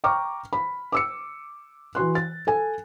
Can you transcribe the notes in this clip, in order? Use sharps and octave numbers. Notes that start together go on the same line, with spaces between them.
G5 A#5 C#6 D6 F6
B5
D6 E6 C#7
E3 F#4 C6 F#6
A6
A4 G#5